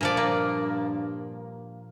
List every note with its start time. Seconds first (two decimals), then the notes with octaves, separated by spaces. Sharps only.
0.01 G2 A#2 F3 D5
0.17 A#3